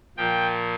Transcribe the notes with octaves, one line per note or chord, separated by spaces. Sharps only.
A#2 F3 G5